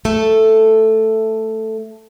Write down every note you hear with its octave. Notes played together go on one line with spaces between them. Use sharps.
A3 A4